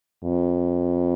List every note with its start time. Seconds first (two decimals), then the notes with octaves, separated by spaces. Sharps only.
0.24 F2